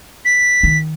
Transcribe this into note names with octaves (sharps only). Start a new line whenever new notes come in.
B6
D#3